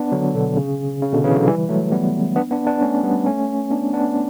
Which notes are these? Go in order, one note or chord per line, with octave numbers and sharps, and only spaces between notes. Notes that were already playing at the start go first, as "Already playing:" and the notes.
Already playing: B3 D4
D3 F#3
B2 D3
C#3
C#3
B2 D3
C#3 E3
D3 F#3
E3 G3
F#3 A3
G3 B3
B3 D4
B3 D4
B3 D4
A3 C#4
G3 B3
A3 C#4
B3 D4
B3 D4